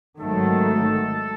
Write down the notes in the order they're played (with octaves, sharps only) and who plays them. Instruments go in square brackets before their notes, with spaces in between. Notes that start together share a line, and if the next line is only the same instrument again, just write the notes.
[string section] G#1 G#2 D#3 F#3 A3 [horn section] A4